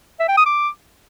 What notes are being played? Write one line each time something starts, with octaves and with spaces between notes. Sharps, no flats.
E5
G5
D#6
D6